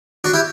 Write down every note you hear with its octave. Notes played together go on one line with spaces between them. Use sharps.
D4 F#4
E4 G4